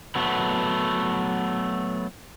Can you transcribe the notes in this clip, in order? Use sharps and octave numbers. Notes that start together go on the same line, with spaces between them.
F#3 A3 B3